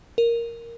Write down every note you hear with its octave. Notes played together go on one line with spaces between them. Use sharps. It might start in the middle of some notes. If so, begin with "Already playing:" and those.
A#4